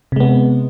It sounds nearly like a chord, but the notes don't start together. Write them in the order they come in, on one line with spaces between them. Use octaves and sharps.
C3 G#3 B3